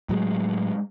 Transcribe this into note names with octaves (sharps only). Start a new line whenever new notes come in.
A2 F#3 G#3